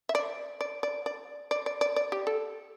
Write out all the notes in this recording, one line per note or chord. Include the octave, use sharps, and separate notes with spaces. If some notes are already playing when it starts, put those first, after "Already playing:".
E5
D5
D5
D5
D5
D5
D5
D5
D5
G4
A4